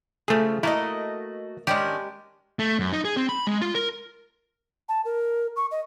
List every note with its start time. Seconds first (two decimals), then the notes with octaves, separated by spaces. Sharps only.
0.28 C#3 F3 A3 G#4
0.63 A3 A#3 E4 F#4 D#5
1.67 D#3 G#3 C#4 D4 G4
2.59 A3
2.79 F#2
2.93 D#4
3.05 G#4
3.17 C4
3.29 B5
3.47 G#3
3.61 F4
3.75 A#4
4.89 A5
5.05 A#4
5.56 C#6
5.71 D#5